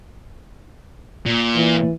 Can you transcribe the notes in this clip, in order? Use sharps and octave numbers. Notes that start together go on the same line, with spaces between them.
A#2
E3